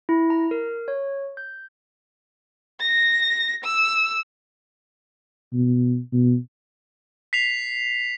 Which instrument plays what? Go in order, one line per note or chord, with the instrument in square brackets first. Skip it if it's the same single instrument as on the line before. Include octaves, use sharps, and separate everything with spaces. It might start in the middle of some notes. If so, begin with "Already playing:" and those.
[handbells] E4
A#5
A#4
C#5
G6
[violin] A#6
E6
[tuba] B2
B2
[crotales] B6 C7 F7